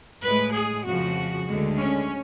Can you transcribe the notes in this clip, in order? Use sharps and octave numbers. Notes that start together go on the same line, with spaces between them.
A2 G#3 B4
G#4
F2 C#3 F3 F#4
D2 D3 G#3
C#4